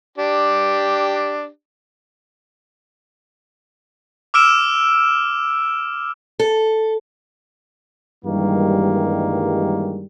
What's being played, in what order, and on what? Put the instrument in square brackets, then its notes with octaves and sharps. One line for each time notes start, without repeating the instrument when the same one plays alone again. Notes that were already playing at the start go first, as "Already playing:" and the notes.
[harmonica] D4 G4
[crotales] D6 E6 F6 D7 E7
[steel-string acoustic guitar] A4
[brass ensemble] G2 D#3 E3 G3 G#3 A#3